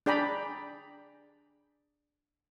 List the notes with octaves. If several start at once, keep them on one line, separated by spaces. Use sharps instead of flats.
D4 G#4 D5 G5 A#5 B5